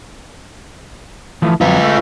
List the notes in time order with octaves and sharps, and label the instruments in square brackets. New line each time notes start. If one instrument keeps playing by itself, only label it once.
[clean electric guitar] E3 F3 A3
[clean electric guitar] F2 F#3 [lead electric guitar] F4 B4
[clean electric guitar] A3